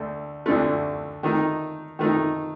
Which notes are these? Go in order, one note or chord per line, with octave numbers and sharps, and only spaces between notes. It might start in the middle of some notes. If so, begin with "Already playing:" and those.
Already playing: D2 A3
D2 D3 A3
D#3 A3 D#4
D#3 A3 D#4